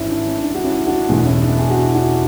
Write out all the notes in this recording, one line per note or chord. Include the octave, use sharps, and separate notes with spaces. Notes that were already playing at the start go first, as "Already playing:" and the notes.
Already playing: G#1 G#2 E3 C#4 E4
D4
C#4
D4
F#4
C#4 E4
D4 F#4
E1 E2 B2 E4 G#4
C#4 E4
D4
G#4
F#4
E4
D4 F#4